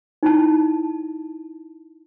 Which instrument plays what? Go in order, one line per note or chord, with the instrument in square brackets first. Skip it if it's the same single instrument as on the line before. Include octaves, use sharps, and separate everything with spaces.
[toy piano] D#4 E4 A5